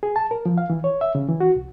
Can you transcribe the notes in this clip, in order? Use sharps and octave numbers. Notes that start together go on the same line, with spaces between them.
G#4
A5
A#4
F3
F5
E3
C#5
E5
C#3
E3
F#4
C2